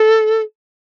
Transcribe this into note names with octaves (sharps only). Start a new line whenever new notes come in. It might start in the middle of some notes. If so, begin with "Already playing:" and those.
Already playing: A4